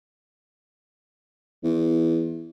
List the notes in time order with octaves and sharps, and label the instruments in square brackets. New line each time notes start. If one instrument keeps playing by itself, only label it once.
[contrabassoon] E2